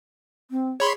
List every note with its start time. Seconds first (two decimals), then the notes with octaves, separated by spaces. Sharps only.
0.51 C4
0.80 G#4 C#5 B5 C6